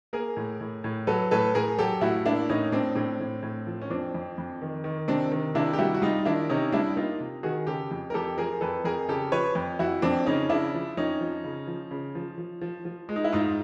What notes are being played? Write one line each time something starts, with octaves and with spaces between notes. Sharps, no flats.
A#3 G#4 A#4
A2
A2
A2
F#3 A4 B4
A2 A4 B4
A2 G#4 A#4
F#3 G4 A4
A2 E4 F#4
A#3 D4 E4
A2 C#4 D#4
A2 C4 D4
A2 C4 D4
A2
A2
F3
C#4
F2 C4 D4
F2
F2
D#3
D#3
C3 C4 D4
D#3
C3 D4 E4
G4
G3 E4 F#4
F#4
G3 D#4 F4
D#3 D4 E4
C3 C#4 D#4
G3 D4 E4
A#3 D#4 F4
C3
D#3 F#4 G#4
C#3 G4 A4
F2
A#4
F2 G4 A4
F3 G#4 A#4
F2 A4 B4
F2 G#4 A#4
C#3 G4 A4
F3 B4 C#5
F2
F2 E4 F#4
F2 C4 D4
C#3 C#4 D#4
C#3 D4 E4
F3
F2 C#4 D#4
F3
C#3
F3
C#3
F3
F3
F3
F3
G#3
D#4
E4
G#2 D#4 F4